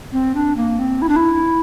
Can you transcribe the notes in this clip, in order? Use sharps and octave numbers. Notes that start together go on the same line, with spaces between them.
C4
D4
A#3
C4
E4
D4
E4